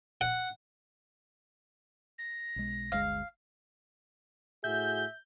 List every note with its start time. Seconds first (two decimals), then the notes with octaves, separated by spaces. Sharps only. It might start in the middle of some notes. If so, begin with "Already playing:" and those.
0.21 F#5
2.18 A#6
2.56 B1 G#3
2.92 G1 D2 G#3 F5
4.64 A2 F#4 G#4 E5 G6